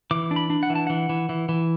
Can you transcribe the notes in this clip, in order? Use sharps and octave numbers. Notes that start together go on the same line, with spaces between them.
E3 D6
D4
B5
D4
F#5
E3
A5
E3 F#5
E3
E3
E3